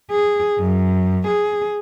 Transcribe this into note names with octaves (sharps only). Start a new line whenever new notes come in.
G#4
F#2
G#4